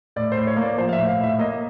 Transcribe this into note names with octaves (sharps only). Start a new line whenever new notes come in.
A2 D5
C5
A2
C#5
A#3
D5
F3 C5
F5
E5
A2
F5
A2 E5
A#3 D#5